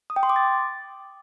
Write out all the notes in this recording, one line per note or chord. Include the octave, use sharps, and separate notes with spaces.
D#6
G5
C6
D6
A6